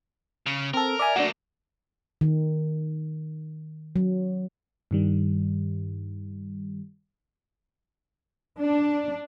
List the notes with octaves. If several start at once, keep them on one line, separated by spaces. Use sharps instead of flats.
C#3
C4 A4 A#4
D5 E5 G#5
A3 A#3 D4 F#4
D#3
F#3
G2 D#3 G3
D4